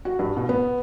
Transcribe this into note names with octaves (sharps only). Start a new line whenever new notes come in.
F#4
G2
B2
B3